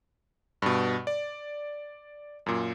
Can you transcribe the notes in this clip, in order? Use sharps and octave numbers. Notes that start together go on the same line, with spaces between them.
G2 B2
D5
F#2 A#2